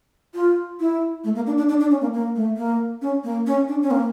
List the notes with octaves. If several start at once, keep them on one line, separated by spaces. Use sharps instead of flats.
F4
E4
A3
A#3
D4
D4
D4
D4
C#4
A#3
A#3
A3
A#3
C#4
A#3
C#4
D4
C#4
A#3